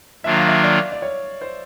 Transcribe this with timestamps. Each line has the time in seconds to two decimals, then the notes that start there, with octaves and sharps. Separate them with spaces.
0.24 D#3 F#3 A#3 D4 F4 E5
0.37 F5
0.48 E5
0.63 D5
0.92 D5
1.02 C#5
1.41 C5